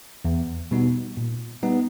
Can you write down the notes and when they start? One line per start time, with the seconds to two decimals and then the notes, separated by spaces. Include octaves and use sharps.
0.25 E2
0.71 B2 G3 B3 D#4
1.17 A#2
1.63 G3 B3 D#4